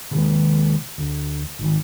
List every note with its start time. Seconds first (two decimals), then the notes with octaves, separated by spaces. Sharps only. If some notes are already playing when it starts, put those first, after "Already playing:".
0.11 C3 D#3 G#3
0.98 D2
1.59 G#1 D#3